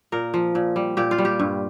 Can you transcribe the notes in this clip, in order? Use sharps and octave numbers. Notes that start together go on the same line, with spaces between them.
A#2 A#4
F3
A#2
G3
A#2 G4
F4
G3
G4
G2